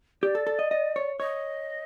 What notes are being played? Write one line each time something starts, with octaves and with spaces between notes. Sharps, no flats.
G4 D5
A4
A4
D#5
D#5
C#5
C#5 D#5